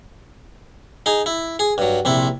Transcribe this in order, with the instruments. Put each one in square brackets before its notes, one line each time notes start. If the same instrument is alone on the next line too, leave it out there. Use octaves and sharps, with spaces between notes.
[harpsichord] D#4 G#4
E4
G#4
G2 F#3
A#1 C3 E4